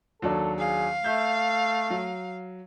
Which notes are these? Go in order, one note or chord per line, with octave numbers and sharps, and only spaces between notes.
D#2 F#3 D4 A4
G#4 F5
A3 E5 G6
F#3